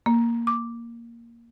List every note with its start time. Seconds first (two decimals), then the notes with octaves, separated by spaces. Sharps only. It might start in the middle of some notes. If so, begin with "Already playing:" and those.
0.06 A#3
0.47 D6